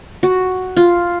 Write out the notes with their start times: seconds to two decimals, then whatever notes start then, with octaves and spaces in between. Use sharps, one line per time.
0.23 F#4
0.77 F4